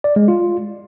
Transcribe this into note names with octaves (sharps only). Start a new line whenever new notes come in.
D5
G#3
F4